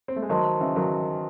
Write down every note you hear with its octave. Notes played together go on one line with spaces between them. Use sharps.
C4
A3
G#3
D#3 F#3 C5 D#5 A5 C6
C#3 E3
D#3 F#3